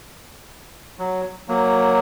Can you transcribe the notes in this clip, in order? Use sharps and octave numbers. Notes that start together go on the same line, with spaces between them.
F#3
F#3 A#3